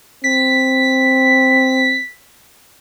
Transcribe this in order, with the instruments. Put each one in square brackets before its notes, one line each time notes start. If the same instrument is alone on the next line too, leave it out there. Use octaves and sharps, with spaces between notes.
[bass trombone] C4 [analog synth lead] B6